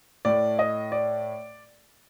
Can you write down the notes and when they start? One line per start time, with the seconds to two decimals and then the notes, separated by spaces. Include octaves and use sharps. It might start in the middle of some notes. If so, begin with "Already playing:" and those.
0.25 A2 A3 D5
0.59 D#5
0.92 D5